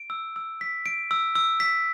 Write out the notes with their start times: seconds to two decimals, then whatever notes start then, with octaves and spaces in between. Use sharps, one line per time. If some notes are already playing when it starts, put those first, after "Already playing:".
Already playing: D7
0.10 E6
0.36 E6
0.61 B6
0.86 D7
1.11 E6
1.35 E6
1.60 B6